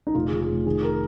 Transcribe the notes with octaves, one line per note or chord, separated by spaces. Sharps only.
D#4
F1 F4
G#4
C#3
G#4
F1
D#3 G#4
A#4